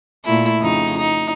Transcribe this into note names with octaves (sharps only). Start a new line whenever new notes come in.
A#2 A3 E4
F2 C#3 D#4
D#4